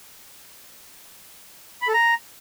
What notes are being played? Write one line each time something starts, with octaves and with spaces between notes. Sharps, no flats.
B5
A4
A#5